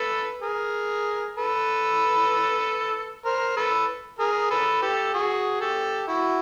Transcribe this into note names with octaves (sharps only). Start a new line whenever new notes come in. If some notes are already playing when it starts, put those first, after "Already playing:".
Already playing: A4 B4
G#4 A#4
A4 B4
A#4 C5
A4 B4
G#4 A#4
A4 B4
G4 A4
F#4 G#4
G4 A4
E4 F#4